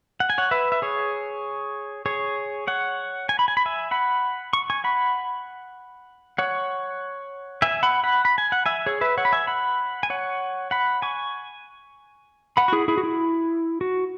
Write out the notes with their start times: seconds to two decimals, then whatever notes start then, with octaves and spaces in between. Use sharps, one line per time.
0.20 F#5
0.30 G#5
0.38 C#5 F#5
0.51 B4 E5
0.72 E5
0.82 G#4 C#5
2.06 G#4 C#5
2.67 C#5 F#5
3.29 G#5
3.39 B5
3.48 G#5
3.57 B5
3.66 E5 G#5
3.91 F#5 B5
4.53 C#6
4.70 G#5 C#6
4.84 F#5 B5
6.38 C#5 F#5
7.62 E5 G#5
7.83 F#5 B5
8.04 F#5 B5
8.25 B5
8.38 G#5
8.52 F#5
8.66 E5 G#5
8.86 G#4 C#5
9.01 B4 E5
9.18 C#5 F#5
9.25 B5
9.33 E5 G#5
9.47 F#5 B5
10.03 G#5
10.10 C#5 F#5
10.71 F#5 B5
11.02 G#5 C#6
12.57 F#5 B5
12.68 F#4
12.73 E4 G#4
12.88 E4 G#4
12.98 F#4
13.03 E4
13.81 F#4